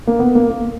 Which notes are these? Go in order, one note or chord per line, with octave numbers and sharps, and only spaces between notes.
A#3
B3
A#3
A#3